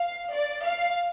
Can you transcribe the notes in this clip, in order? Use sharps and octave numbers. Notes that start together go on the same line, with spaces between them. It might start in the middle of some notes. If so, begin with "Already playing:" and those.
Already playing: F5
D5
F5